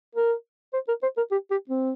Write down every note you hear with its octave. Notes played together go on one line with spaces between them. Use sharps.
A#4
C5
A#4
C5
A#4
G4
G4
C4